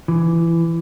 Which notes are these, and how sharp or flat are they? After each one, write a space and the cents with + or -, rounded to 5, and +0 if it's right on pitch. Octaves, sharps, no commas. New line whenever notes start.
E3 +20